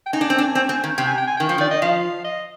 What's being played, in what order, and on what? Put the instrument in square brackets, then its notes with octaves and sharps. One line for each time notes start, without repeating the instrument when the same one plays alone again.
[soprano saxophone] G5
[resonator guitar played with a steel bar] D#4 [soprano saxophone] G#5
[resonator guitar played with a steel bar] D4
C4
D4
C4
C4
D#3
[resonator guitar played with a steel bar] C3 [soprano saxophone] G5
[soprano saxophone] G#5
G5
G#5
[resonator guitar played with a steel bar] D#3 [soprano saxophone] G5
[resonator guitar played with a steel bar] F3
D#3
[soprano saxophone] D5
D#5
[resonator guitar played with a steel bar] F3 [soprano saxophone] F5
[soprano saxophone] D#5